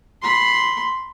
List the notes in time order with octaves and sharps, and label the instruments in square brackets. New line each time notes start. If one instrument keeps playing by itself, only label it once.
[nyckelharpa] B5 C6